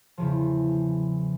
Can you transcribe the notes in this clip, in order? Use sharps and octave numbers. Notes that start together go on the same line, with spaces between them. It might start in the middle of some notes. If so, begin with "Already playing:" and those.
E2 C#3 F3